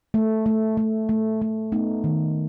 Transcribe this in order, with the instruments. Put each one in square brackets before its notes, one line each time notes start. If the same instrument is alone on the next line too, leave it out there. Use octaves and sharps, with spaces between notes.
[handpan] A3
A3
A3
A3
A3
A3 B3 D#4
D#3